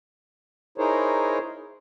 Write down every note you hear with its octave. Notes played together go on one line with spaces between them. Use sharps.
D#4 E4 G#4 A#4 C5 C#5